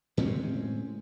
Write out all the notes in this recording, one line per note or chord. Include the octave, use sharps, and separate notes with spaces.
A2 G#3 C4 C#4